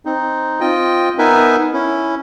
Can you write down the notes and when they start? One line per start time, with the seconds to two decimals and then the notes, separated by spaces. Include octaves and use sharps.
0.05 C4 D#4
0.61 C4 F4 D#5 G5
1.18 B3 D#4 A#4 B4 E5 G#5
1.73 C#4 E4